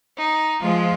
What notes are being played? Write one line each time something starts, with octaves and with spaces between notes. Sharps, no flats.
D#4
F3 G#3 F4